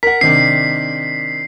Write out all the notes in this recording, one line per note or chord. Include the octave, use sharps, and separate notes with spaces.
A#4 F#5 B6
C3 D#3 D4 C7